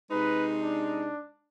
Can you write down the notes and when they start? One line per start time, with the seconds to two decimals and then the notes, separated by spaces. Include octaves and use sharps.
0.11 C3 G#3 D#4 B4
0.61 D4